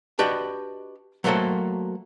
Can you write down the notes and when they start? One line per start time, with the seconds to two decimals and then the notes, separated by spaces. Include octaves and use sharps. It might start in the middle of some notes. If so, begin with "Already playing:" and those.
0.19 D4 F#4 G4 B4 D5 D#5
1.24 F#3 A3 A#3 F#4 A4 C5